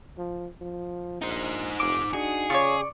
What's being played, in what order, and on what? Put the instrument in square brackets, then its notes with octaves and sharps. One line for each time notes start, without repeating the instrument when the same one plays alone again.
[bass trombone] F3
F3
[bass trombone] A#1 [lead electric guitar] D#4 C5
[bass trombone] F1 [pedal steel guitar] D6
[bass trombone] D4 [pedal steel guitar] D#4 F#4 [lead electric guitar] G#4
[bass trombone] C#3 [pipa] F4 G4 C#5 [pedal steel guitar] D5 C#6